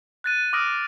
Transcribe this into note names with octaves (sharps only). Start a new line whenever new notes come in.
F#6 A6 D#7
D6 D#6 F6 A#6 D7